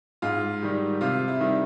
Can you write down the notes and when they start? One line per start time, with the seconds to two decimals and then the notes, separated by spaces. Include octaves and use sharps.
0.22 G#2 F4
0.62 D#3 G3
1.01 C3 F4
1.28 E4
1.40 D#3 G3